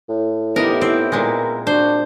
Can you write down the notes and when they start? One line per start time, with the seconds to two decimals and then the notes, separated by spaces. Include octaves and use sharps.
0.09 A2
0.56 B3 D#4 E4 G4 A#4
0.81 C4
1.12 A#2 G#3 A#4
1.67 D4 F#4 C5